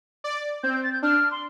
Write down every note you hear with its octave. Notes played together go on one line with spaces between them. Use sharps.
D5
C4 G6
G6
A6
G6
D4 F6
C6